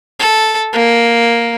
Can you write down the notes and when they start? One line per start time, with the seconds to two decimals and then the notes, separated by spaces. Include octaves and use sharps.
0.20 A4
0.73 A#3